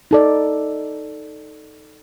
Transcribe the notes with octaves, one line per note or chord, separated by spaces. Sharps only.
D#4 A4 D5